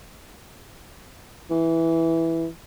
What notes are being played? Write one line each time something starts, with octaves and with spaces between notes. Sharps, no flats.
E3